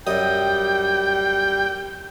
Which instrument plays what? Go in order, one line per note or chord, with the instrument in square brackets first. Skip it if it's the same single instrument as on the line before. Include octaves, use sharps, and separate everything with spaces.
[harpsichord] F#2 D#5 [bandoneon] G3 [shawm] G5